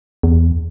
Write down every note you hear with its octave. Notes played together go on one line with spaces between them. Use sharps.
E2